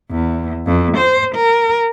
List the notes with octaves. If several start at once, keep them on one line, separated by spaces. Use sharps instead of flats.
E2
F2
C5
A#4